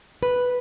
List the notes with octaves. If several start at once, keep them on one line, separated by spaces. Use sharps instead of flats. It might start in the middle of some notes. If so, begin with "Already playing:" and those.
B4